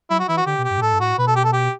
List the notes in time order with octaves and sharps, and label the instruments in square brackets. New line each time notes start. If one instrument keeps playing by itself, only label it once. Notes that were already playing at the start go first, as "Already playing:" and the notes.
[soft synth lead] F#3 [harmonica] E4
[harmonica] F#4
[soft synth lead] E3 [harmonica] E4
[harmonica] F#4
[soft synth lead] D3 [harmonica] G4
[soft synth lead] B2
[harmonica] G4
[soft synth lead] G2
B2
[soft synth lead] A2 [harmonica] A4
[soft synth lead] G2
[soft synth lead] A2 [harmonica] F#4
[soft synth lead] B2 [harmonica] B4
[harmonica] A4
G4
A4
G4